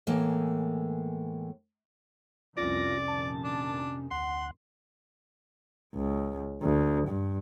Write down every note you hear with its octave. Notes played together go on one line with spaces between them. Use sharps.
A2 E3 G#3 A#3 B3
F1 C2 F2 C3 C#4 F4 D5 A#6
A#1 F2 D#3 A5
D4
D2 F#5 C6
C#2
D2
G2